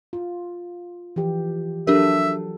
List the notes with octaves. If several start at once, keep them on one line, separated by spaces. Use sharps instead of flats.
F4
E3 F3 G4
F#3 D4 G4 A4 A#4 E5